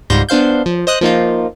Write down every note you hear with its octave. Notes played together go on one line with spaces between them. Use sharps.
C#2 G#2 G3 C6 G6 A#6
B3 D4 C5 F5 G6
F3
C5 D#5 D#6 F#6
F3 A#3 D#4 F4